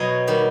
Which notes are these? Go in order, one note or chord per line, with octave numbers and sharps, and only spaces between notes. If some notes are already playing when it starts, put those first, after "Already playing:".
Already playing: B2 F#3 C#5 D#5
D#3 G3